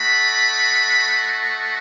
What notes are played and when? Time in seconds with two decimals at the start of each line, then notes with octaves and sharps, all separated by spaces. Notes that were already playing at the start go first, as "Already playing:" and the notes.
Already playing: A3 D#4 F#4 B5